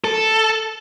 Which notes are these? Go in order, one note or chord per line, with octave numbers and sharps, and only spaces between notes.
A4